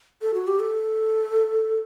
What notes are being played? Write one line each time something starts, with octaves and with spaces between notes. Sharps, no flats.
A4
F#4
G4
A4